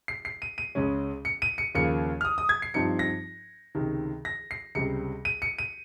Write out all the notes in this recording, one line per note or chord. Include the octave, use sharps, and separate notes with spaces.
C7
C7
D#7
D#7
C#2 C#3 G#3 C#4
C#7
D#7
C#7
D#2 C#3 F3 A#3 C#7
F6
D#6
D#6
G#6
C7
G2 F3 C4 D#4 C#7
A#6
C#2 C3 D#3
A#6
C7
C#2 C3 G3 C#7
D#7
C#7
D#7